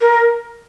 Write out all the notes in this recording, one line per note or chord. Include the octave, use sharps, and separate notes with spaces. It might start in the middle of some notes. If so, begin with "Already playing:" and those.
A#4